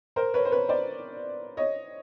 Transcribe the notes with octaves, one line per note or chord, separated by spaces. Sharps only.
A#4 C5
B4 C#5
C5
B4 C#5
C5 D5
C#5 D#5